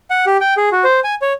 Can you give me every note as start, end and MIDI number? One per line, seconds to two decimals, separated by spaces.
0.10 0.25 78
0.27 0.37 67
0.41 0.54 79
0.57 0.69 68
0.72 0.84 66
0.84 1.00 72
1.04 1.15 80
1.22 1.33 73